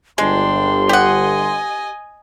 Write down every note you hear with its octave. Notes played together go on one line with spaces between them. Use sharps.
G1 G#3 D4 G5 C6
G4 D#5 F#5 G#5